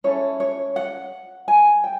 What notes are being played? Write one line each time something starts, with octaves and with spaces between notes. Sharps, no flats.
C#4 E4 A4 C#5
C#5
F#5
G#5
G5